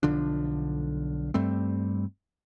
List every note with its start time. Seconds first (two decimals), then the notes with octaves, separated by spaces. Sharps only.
0.03 B1 D3 F3 D4
1.34 G2 G3 A3 C4